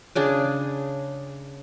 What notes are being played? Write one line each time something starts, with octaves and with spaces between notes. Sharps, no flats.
C#3 D4 G#4